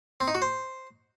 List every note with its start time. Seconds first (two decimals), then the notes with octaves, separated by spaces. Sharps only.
0.20 C4
0.28 D#4
0.35 F#4
0.42 C5